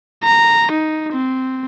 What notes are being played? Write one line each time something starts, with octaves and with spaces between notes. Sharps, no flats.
A#5
D#4
C4